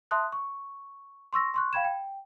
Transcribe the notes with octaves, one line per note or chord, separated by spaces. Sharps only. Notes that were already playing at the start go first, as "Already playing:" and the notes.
E5 A5 C6 D#6 F#6
C#6
C6 C#6 E6 A#6
C6 C#6 F#6
F5 G5 B5 G#6 E7
G5